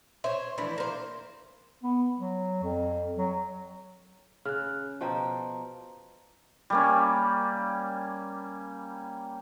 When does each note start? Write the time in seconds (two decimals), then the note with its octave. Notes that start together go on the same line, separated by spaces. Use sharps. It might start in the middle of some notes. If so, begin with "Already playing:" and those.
0.24 C5 C#5 E5
0.58 E3 F3 A3 D4 E4
0.78 A#3 C5
1.83 B3
2.19 F#3
2.63 F2
3.16 F#3
4.45 C#3 F6 F#6
5.01 B2 F3 G5 A5 A#5
6.70 G3 A#3 C#4